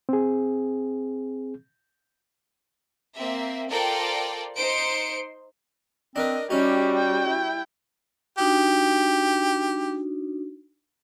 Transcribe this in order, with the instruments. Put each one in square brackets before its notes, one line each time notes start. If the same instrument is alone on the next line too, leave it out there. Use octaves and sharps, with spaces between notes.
[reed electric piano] C4 G#4
[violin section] A#3 C4 E5
F4 A4 A#4 C5 D5 G5
D#4 C5 C6 C#7 D7
[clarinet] C4 [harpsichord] D4 A#4 B4 [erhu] D#5
[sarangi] G3 [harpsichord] C#4 D#4 [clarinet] F#4 [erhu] G4
[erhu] G5
[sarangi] E4
[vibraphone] D4 D#4 F#4 [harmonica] G4